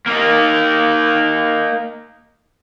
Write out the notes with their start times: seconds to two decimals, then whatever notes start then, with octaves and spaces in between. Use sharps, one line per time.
0.06 A#3 D#4